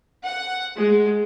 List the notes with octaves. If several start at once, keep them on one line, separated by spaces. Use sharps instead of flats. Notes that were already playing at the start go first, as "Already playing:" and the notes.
F#5
G#3